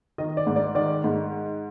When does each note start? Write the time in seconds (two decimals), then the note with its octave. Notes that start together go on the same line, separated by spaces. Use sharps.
0.18 D#3 D#5
0.37 D5
0.47 G#2
0.56 D5
0.75 D#3 D5
1.04 G#2